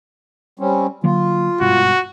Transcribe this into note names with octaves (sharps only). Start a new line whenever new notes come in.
G3 C4 C#4
D3 F#3 A#3 F4
G#1 G2 B2 F#4